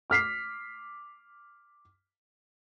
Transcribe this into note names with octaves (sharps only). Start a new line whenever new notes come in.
D6 F6 B6 C7